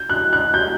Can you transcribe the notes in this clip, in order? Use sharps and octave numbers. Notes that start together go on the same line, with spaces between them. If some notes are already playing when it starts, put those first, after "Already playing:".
Already playing: G6
F#6
F#6
G6